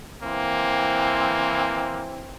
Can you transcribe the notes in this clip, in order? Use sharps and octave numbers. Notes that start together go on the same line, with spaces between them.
E3 A#3 C4